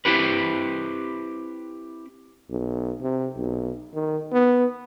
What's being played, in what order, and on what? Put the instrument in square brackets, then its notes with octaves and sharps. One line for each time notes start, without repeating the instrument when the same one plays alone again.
[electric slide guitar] C4 E4 G4 B4
[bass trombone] B1
C3
B1
D#3
B3